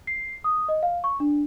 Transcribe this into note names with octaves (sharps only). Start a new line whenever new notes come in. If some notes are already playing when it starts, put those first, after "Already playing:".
C7
D#6
D#5
F5
C#6
D4